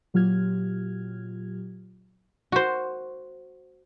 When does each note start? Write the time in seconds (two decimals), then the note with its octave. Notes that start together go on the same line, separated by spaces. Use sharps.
0.14 A#2 F#3 F4 G4 F6 G#6
2.52 F#4 C5